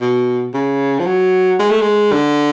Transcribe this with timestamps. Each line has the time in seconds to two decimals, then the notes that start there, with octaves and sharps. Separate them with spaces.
0.01 B2
0.54 C#3
0.99 F3
1.07 F#3
1.59 G#3
1.71 A3
1.81 G#3
2.12 D3